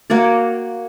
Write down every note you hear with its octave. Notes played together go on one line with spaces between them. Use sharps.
A#3 F#4 C#5 D5